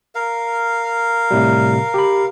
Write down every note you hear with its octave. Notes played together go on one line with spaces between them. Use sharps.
A#4 F5
A2 C3 G3
G4 B5